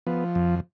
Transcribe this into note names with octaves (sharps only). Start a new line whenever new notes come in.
F3 B3
F2